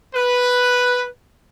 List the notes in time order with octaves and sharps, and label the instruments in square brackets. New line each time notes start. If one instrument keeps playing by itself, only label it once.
[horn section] B4